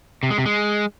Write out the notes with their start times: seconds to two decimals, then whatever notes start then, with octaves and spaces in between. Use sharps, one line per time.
0.23 C3
0.30 G#3
0.38 C3
0.46 G#3